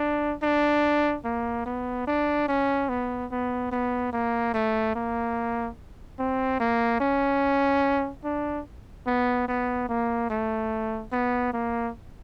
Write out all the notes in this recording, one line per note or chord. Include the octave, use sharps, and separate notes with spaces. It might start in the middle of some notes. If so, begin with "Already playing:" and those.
Already playing: D4
D4
A#3
B3
D4
C#4
B3
B3
B3
A#3
A3
A#3
C4
A#3
C#4
D4
B3
B3
A#3
A3
B3
A#3